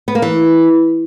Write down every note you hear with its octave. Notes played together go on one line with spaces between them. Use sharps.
B3
A#3
E3